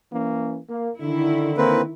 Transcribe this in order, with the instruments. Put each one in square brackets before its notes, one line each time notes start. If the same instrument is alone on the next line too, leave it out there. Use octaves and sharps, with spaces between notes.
[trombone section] E3 A#3 C#4
A#3
[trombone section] D3 [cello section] D#3 E4
[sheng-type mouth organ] A#3 C4 B4